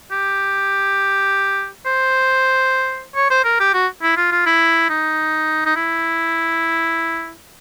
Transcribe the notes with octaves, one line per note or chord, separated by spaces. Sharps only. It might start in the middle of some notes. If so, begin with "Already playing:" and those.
G4
C5
C#5
C5
A#4
G4
F#4
E4
F4
F4
E4
D#4
D#4
E4